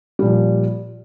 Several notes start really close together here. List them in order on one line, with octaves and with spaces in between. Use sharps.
G3 A#2 F3